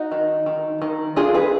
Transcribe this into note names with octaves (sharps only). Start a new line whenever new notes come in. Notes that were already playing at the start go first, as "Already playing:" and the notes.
Already playing: D#4 F#4
D#3
D#3
D#3
D4 F4 G#4
G#4 B4